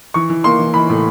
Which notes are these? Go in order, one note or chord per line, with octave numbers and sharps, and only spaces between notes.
E3 C#6
E3
A#3 C6
E3
E3 B5
A2